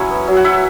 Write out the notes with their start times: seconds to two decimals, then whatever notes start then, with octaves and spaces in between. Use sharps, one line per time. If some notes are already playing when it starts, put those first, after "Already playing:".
Already playing: F#3 C#4 E4
0.11 B3
0.28 F#3
0.37 F#5
0.44 E4 E5